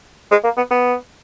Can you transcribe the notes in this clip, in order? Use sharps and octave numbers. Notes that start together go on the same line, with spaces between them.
G#3
A#3
B3
B3